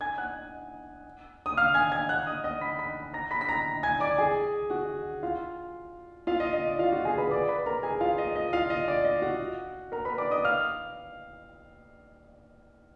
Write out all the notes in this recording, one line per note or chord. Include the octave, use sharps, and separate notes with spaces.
G#5 G#6
F#5 F#6
D#6
F5 F6
G#5 G#6
G#5 G#6
F#5 F#6
D#5 D#6
D#5 D#6
B5 B6
B5 B6
A#5 A#6
B5 B6
B6
A#5 A#6
G#5 G#6
D5 D6
G#4 G#5
F#4 F#5
F4 F5
F4 F5
D#5
D#5
D5
F4 F5
F#4 F#5
G#4 G#5
B4 B5
D5 D6
B4 B5
A#4 A#5
G#4 G#5
F4 F5
D#5
D#5
F4 F5
D#5
D5
D#5
F#4 F#5
A#4 A#5
B4 B5
D5 D6
D#5 D#6
F5 F6